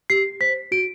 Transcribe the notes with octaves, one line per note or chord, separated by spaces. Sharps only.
G4 C7
C5 B6
F#4 D7